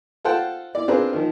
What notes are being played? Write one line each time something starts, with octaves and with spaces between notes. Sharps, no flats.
F4 A4 C5 F#5 G5 A5
E4 D5
C4 D4 F4 G#4 A#4 B4
D#3 F3